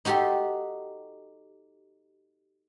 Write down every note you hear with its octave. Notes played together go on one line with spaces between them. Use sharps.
D#4 F#4 G4 A4 C6